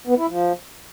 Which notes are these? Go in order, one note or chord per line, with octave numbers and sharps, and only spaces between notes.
B3
E4
F3